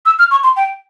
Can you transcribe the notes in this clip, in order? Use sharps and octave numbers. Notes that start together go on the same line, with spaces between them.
E6
F6
C#6
C6
G5